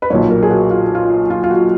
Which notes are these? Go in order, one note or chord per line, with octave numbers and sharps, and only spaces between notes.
B4
B1 A#2 F#3 C#5
A#4
G#4
F#4
F4
F4
F4
F4
F#4